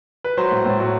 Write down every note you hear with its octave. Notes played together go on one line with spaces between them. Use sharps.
B4
F#3 C5
A2
A2
F#3